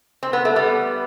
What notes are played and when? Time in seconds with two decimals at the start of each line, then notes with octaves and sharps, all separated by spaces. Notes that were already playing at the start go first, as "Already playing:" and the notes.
0.23 C4
0.33 B3
0.45 A3
0.56 G3 B3